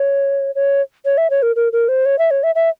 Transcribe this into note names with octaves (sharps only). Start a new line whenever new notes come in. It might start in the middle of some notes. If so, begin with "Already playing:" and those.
Already playing: C#5
C#5
C#5
E5
C#5
A#4
A#4
A#4
C5
C#5
E5
C#5
E5
E5